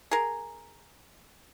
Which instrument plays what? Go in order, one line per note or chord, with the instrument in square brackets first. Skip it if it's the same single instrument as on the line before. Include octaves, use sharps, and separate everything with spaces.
[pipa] G#4 A#4